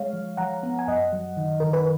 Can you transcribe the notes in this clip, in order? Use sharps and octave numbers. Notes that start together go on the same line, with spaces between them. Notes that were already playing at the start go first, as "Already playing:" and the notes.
Already playing: G#3 C#5 F5
F3
F3 F#5 A#5
B3
G#5
F#2 D#5 F#5
F#3
D#3
D#3 A#4
B4